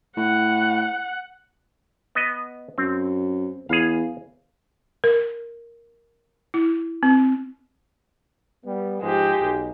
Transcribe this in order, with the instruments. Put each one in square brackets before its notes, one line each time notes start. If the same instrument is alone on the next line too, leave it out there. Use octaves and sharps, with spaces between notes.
[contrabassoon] A2 [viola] F#5
[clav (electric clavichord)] B3 D#5
[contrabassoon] F#2 [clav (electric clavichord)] C4
[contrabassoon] E2 [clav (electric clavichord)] G#4 F5
[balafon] A#4
E4
C4
[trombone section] G3 B3
[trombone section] G#2 F3 [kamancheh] G#3 G4
[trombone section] B1